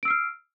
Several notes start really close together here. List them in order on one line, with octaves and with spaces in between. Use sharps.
D7 E6 C7 F6